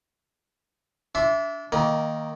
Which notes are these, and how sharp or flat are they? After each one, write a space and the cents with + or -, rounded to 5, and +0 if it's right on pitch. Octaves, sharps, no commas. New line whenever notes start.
D4 -30 E5 +5 C6 +0
D#3 +0 A#3 -5 A#5 +35